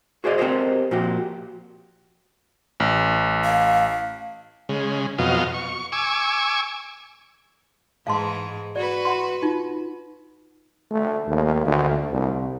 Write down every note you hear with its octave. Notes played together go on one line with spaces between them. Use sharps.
F#4 G#4 C5 D5 D#5
C4 G4 A4 A#4 C5 D#5
A#2 F3 F#4 G4
A1
F5
C#3 G#3
F2 B2 F#3 D#5 F5
C#6
G#5 C#6 D6 E6
G#2 E3 G#4 F5 A5 C6
F#4 B4 D5
F#5 C6
D#4 F4
A3
D#2
D2
C2